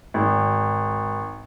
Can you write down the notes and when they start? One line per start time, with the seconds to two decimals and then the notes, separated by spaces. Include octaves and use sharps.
0.14 G#1